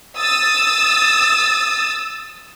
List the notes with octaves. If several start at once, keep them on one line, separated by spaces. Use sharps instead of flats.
D#6 E6 A6